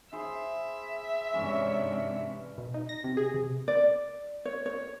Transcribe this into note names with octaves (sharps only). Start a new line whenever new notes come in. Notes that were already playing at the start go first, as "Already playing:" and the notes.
E4 G#4 C5 E5
G#2 C3 E3 C#4 D4
B2
D#4
A#6
C3
G#4
C3
D5
C#5
C#5